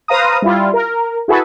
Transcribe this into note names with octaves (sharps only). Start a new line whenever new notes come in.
B4 C5 F5 A#5 D#6
G3 E4 F4
A#4
E4 F#4 G#4 A4 B4